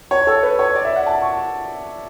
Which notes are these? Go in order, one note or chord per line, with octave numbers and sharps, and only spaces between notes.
C#5
A4
B4
C#5
D5
E5
F#5
A5
C#6